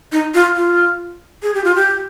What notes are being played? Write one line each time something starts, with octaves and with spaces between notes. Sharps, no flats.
D#4
F4
F4
G#4
G4
F4
G4